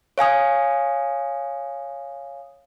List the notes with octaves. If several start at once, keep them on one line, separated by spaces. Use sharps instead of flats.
C#5 F5 G#5 D#6